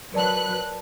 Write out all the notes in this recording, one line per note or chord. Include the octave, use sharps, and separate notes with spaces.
F#3 A#4 B4 D5 A5 F#6